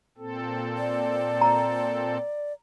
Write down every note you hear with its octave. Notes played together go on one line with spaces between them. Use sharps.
A#2 C4 A4
D5
A#5